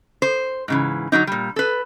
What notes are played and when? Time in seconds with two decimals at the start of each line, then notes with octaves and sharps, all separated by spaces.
0.22 C5
0.68 G#2 C#3 E3
1.12 D3 F#3 C4 D#4
1.27 A#2 G3
1.56 A4 B4